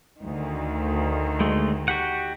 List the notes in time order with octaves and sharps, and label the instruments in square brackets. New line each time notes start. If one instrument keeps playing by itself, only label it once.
[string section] D2 D#3
[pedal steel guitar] G#3 A3
F#4 G4 F#5